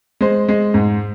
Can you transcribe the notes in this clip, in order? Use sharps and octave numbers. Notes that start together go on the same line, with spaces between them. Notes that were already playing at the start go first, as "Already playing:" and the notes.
G#3 C5
G#3
G#2